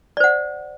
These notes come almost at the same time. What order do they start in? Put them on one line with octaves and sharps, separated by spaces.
D5 C5 F#5